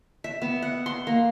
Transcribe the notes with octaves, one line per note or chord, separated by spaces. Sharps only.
E5
B3
F#5
C6
A#3